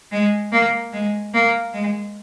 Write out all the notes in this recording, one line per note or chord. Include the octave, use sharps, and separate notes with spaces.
G#3
A#3
G#3
A#3
G#3